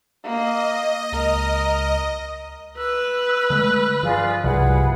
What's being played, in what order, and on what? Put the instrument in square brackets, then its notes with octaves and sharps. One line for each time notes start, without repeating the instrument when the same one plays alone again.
[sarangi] A#3 [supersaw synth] D#5
[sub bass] C#2 [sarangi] A#4
[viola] B4 [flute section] E6
[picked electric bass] D3 G#3 A3
[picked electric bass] G1 F3 [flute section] F4 G#4 D5
[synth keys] C2 [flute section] G#4 B4 F#5